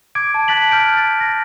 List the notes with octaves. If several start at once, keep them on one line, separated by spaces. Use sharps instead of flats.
D6 G#6 D7
A5
A5 F#6 A6 B6 F#7
F6 G6 D7
A6
A#6